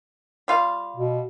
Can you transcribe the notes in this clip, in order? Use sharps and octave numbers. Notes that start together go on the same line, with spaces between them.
G3 F4 F5
B2